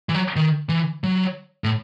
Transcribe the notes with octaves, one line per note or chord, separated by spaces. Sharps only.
E3
F#3
D#3
E3
F#3
A2